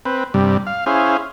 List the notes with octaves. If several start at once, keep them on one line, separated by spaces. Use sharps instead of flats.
C4 B4
G2 C3 G3
F5
C#4 E4 G#4 C5 F5